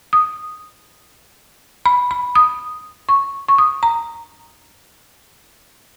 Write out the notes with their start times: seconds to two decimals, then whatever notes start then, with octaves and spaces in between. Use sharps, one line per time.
0.13 D#6
1.86 B5
2.11 B5
2.35 D#6
3.09 C#6
3.48 C#6
3.58 D#6
3.83 A#5